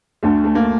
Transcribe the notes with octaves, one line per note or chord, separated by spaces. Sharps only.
D2 D3 A3
A3
A#3